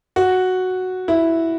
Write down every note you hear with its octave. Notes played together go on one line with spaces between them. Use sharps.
F#4
E4